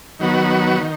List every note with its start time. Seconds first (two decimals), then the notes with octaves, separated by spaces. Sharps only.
0.19 D#3 F#3 B3 F#4
0.80 D#3